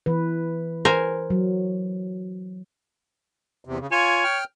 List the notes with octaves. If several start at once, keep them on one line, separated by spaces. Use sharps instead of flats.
E3 B4
A#4 C5 G#5
F#3
E2 C3
C#3
F4 C#5 G#5
G5 F6